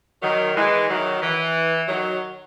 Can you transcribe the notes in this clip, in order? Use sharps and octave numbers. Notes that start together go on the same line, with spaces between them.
D#3 F#3
E3 G#3
D#3 F#3
E3
D#3 F#3